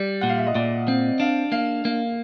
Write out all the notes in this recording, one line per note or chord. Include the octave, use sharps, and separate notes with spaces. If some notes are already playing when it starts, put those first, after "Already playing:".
Already playing: G3 D5
A#2 F#5
F5
E5
D#5
A#2 D5
C4
D4 F5
A#3 F5
A#3 F5